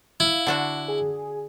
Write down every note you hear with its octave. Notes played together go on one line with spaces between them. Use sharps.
E4 F5
D3 D4 F#4 F#5
G#4